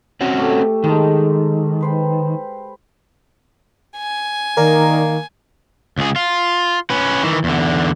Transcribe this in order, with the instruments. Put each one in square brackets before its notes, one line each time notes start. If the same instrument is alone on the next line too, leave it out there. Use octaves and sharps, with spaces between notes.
[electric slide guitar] C4 C#4 F#4
[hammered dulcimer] A3 G4
[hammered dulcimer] G#2 A4 A5 [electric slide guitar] D#3
[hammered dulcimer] B4 C5 G5
[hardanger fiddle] G#5
[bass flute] D#3 [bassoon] A#3 [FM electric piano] A#4 D5 A#5
[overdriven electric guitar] C#2 G#4
F4
C#4 B4
D#3 E3
E2 D3